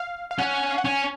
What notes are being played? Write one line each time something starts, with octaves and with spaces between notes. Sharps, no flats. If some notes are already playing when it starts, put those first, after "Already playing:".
Already playing: F5
F5
C#4 F#5
F5
F#5
C#4 G#5